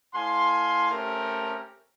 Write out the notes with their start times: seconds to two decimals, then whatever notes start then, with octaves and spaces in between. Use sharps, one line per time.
0.14 A2 F5 G#5 C6
0.90 A3 C4 C#4 G4 A#4